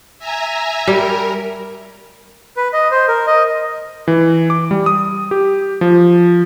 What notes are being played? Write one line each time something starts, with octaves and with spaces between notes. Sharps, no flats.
E5 G#5 A#5
G3 A#4
B4
D#5
C5
A#4
D#5
E3
D6
G3
D#6
G4
F3